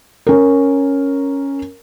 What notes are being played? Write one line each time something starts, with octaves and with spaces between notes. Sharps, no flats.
C#4 A#4